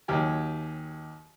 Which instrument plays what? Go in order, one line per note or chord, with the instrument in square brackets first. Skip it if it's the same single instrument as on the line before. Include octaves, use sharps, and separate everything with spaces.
[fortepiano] D#2 F#3 G4 G#5